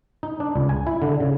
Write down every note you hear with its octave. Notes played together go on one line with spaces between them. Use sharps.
D#4
D4
C#2
G#5
E4
D3
C#3